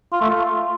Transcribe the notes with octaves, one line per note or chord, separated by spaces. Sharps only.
F4
A3
F4